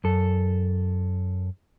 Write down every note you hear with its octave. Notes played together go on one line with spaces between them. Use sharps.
F#2 A4